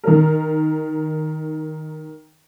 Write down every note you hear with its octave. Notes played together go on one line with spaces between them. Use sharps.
D#3 A#4